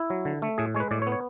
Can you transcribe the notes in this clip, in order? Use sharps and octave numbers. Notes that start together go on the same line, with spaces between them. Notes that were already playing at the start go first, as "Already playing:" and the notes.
Already playing: E4
F#3
D3
A3
A2 G#4
G#3 C#5
B4
A2 D5
C#5
B3
C#5